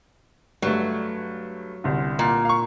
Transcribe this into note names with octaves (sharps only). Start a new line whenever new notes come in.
G2 F#3 A3
G1 C2 D3
A#2
F5 C#6